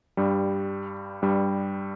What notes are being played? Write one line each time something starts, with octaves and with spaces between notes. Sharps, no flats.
G2 G3
G2 G3